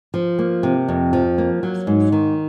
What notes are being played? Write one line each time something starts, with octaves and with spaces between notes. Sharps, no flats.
F3
A#3
C3
F2
F3
A#3
F#3
G#2
D#3